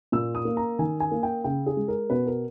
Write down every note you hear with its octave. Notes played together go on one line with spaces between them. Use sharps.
A#2 E6
D#6
A#3
A#5
D#3 G#5
G#5
A#3
G5
C#3 G5
G#4
G#3
A#4
B2 B4
A#4